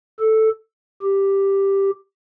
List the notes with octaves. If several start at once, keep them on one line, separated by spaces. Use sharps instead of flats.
A4
G4